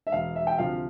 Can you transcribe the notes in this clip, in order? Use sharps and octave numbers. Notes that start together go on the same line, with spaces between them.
E5
E1 F5
E5
G5
D2 C3 F3 F5